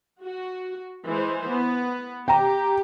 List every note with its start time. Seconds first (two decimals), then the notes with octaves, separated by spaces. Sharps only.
0.23 F#4
1.07 E3 G#3 C5
1.49 B3
2.28 G4 G5 A#5